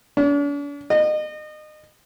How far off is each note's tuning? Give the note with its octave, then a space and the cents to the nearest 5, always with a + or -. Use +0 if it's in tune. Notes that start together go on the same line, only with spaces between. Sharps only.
D4 -45
D#5 -30